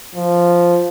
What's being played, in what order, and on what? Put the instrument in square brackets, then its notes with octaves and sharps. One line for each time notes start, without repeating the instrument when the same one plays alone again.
[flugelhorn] F3